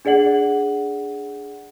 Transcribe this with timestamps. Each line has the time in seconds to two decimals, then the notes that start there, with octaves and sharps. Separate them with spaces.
0.05 D4 G#4 D5 F#5 F#7